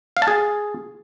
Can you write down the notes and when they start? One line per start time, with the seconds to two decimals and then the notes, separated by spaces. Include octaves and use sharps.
0.17 F5
0.22 A5
0.28 G#4